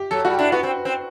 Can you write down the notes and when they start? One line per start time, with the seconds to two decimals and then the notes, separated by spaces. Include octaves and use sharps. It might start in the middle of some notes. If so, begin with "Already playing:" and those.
Already playing: G4
0.11 F#3 A4
0.25 G3 F#4
0.38 D4 E4
0.52 B3 F#4
0.63 C4
0.85 C4